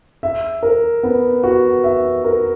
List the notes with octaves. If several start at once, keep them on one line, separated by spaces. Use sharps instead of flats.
E5
A#4
B3
F#4
E5
A#4